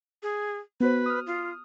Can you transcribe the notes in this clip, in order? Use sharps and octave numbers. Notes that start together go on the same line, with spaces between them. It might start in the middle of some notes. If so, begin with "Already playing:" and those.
G#4
B3 F#4 B4 C5
D#6 F6
F4